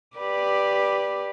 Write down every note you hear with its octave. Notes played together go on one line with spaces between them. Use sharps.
G4 B4 D5